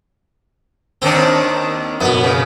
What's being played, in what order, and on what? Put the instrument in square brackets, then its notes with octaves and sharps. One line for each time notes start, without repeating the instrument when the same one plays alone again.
[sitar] D#2 D#3 D4 [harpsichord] C4
[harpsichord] F#2 B2 [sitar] B3
[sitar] C#3